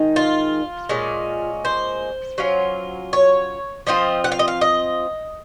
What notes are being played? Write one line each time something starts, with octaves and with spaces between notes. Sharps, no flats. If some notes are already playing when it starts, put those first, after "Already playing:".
Already playing: D#3 G#3 D#4
F4
A#2 G#3 C#4
C5
F#3 C#4 F4
C#5
F3 C4 F4 D#5
F#5
F5
D#5
F5
D#5